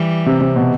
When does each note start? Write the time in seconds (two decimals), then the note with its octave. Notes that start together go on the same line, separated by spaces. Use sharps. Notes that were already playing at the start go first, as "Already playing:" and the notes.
Already playing: E3 G3
0.26 C3
0.41 C3
0.56 B2